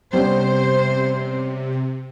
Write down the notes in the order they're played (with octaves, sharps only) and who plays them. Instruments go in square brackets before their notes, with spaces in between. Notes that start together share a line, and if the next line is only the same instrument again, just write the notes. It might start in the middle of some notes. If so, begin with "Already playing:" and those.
[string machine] C3 [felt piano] G3 B3 C#4 [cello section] C5